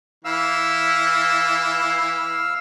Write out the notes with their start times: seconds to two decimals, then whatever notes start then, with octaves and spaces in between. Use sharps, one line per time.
0.25 E3 F5 E6